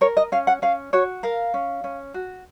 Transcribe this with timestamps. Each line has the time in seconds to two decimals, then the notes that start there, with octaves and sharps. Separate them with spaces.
0.01 A#4 C#5
0.17 D#5
0.32 C#4 F5
0.47 F#5
0.62 C#4 F5
0.93 F#4 C#5
1.23 A#4 F5
1.54 C#4
1.84 C#4
2.14 F#4